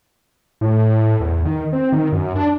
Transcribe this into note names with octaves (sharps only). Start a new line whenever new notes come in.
A2
E2
D#3
C4
D#3
F#2
D4